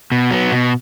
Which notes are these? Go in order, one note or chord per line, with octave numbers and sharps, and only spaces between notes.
B2
F#3 B3
B2